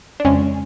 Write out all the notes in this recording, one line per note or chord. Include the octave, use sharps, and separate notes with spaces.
D4
F2 C#3 G#3 C#4